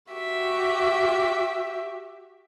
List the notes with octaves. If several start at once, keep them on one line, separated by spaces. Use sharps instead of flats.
F#4 G4 E5